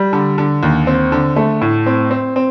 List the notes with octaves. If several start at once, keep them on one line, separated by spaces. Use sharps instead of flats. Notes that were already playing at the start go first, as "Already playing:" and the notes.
Already playing: G3
D3
D3
D#2
C4
D3
A3
A2
C4
C4
C4